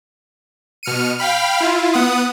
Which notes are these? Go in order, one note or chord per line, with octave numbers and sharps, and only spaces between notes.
B2 F6 C#7 D#7
F5 G5 B5 F6
E4 F4
B3 F#5 D#6